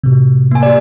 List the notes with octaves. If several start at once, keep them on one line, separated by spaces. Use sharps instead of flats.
A2 C3
A#3 G#5
G4 D5